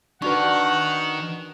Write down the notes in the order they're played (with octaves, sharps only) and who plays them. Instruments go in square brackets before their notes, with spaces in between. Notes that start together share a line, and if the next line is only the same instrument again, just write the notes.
[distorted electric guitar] D#3 [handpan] D4 F#4 B4 [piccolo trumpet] F#5 [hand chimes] C#6